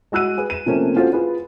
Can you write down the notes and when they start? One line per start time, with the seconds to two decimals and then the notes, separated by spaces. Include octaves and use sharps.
0.12 G#3 F#4 E6 F#6 D#7
0.38 G#4 B4
0.50 D#7 E7
0.66 C3 F3 A3 A#3 C4 C#4
0.96 C#4 F4 F#4 A4 C5
1.13 F4 G#4 B4